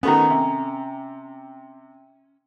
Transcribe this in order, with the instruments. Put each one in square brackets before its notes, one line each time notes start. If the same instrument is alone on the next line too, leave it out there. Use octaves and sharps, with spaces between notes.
[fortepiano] D#3 A3 B3 [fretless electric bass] C#4 [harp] G#5 A#5
[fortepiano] C3